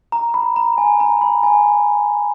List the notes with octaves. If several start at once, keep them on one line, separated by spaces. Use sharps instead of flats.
A#5
B5
A#5
G#5
A#5
B5
G#5